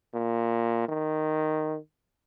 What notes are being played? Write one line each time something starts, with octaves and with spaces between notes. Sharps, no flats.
A#2
D#3